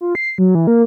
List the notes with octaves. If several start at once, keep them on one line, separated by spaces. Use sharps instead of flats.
F4
C7
F#3
E3
A#3